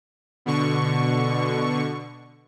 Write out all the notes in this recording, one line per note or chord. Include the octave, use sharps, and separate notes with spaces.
B2 D3 C#6